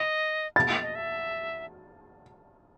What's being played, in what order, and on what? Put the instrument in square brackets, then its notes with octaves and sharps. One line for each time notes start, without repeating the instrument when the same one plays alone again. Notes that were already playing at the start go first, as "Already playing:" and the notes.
Already playing: [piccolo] D#5
[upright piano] A6
[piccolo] D#5
E5